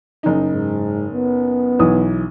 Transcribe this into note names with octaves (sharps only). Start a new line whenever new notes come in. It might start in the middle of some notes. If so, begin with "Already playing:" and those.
F#1 D#4
G#2
B3
B1 E3 D#6